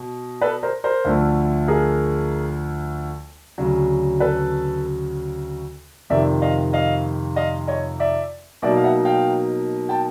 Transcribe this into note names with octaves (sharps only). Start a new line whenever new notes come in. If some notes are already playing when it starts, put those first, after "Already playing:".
Already playing: B2
A4 B4
A#4 C5
A#4 C5
D2 D3 F3 A3
G#4 A#4
D2 C#3 F#3
A4 B4
F2 C3 D#3 D5 E5
D#5 F5
D#5 F5
D#5 F5
C#5 D#5
D5 E5
B2 F#3 A#3 D#4 D5 E5
F5
E5 F#5
F5 G5
G5 A5